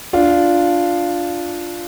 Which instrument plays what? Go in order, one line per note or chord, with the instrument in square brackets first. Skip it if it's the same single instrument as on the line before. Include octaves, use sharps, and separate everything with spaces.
[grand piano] D4 F4